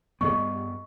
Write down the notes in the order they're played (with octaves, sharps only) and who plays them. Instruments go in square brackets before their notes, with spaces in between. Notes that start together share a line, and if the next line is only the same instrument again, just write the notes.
[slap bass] G2 G3 B3 [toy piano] G#4 D#5 C#6